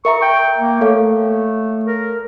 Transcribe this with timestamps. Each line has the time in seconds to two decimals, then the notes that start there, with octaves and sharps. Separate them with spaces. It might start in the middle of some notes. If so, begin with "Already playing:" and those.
0.05 A#4 E5 A#5 C#6
0.22 G5
0.58 A#3
0.81 A3 A4 C#5 F5
1.85 A#4